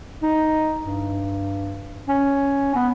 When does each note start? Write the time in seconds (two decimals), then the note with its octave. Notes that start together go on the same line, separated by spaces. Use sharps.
0.23 D#4
0.84 G2
2.09 C#4
2.75 B3